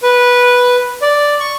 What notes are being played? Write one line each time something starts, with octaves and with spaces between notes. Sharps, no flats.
B4
D5
C#6